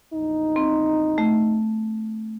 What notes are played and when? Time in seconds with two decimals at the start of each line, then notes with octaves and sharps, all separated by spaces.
0.14 A#1 E2 D#4
0.56 C4
1.18 A3